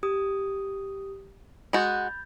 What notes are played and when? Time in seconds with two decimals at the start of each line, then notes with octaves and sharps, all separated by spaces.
0.03 G4 D#6
1.73 G#3 F#4 B5 G6 A6